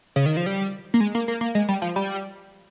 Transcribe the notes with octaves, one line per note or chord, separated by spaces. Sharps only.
C#3
D#3
F3
G3
A#3
G#3
A#3
A#3
A#3
G#3
G3
F3
G3